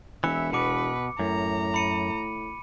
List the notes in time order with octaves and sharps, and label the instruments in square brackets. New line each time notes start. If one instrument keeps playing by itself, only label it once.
[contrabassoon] E1 [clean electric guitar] E3 [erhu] E5 [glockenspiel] C#7
[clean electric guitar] B2 [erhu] B4 [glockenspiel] D6 C#7
[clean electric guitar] F#2 [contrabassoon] A2 [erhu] A#5
[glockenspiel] B5 C#7 D#7